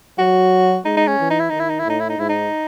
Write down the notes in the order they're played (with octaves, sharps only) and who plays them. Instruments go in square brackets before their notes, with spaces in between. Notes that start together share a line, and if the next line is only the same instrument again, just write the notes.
[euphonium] F#3 [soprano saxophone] F#4
[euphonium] G#3 [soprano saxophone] D#4
[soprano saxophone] D#4
C#4
[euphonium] E3
[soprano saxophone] D#4
E4
[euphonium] D#3 [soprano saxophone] D#4
[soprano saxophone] E4
D#4
E4
[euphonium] A2 [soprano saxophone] D#4
[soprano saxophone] E4
D#4
[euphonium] G#2 [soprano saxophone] E4
[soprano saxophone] D#4